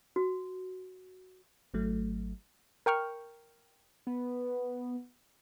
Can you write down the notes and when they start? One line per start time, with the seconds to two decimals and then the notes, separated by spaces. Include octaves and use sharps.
0.16 F#4
1.74 G#1 F#3 A3
2.86 A#4 G5 C#6 F6
4.07 B3